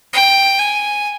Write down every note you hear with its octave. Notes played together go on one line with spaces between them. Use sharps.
G5
G#5